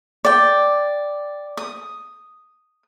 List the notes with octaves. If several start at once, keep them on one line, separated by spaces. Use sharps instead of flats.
D5 G5
D#6